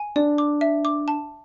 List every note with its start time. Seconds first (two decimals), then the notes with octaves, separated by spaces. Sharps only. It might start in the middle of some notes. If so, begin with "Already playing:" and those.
Already playing: G#5
0.16 D4 D5
0.38 D6
0.61 E5
0.85 D6
1.08 A5